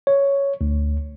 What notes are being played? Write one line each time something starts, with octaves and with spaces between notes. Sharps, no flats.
C#5
D2